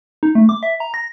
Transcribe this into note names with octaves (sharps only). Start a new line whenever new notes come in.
D#4
A3
D6
E5
A#5
A#6